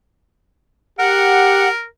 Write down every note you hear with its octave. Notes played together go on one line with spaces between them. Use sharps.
G4 A#4 F#5